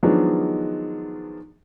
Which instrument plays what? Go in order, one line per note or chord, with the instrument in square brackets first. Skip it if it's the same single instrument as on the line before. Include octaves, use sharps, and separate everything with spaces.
[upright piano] D#3 F3 F#3 G#3 B3 D4